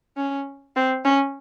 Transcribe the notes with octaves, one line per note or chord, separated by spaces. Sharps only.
C#4
C4
C#4